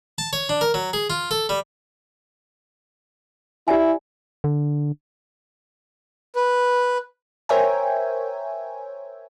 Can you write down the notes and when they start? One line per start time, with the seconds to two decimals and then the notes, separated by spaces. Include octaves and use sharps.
0.18 A5
0.33 C#5
0.49 D4
0.61 A#4
0.74 F#3
0.93 G#4
1.10 F4
1.31 A4
1.49 G3
3.68 E4 G4 D5 G#5
4.44 D3
6.36 B4
7.49 A#4 C5 C#5 E5 G5 G#5